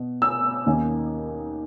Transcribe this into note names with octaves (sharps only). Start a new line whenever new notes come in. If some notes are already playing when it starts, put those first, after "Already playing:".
Already playing: B2
E6
D#2 D#3 A#3 C#4